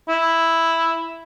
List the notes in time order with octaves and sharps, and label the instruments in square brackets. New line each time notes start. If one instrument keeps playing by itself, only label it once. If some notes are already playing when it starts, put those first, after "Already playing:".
[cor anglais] E4